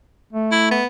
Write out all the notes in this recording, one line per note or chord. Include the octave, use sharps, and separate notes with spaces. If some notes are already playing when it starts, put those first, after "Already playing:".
A3
E4
B3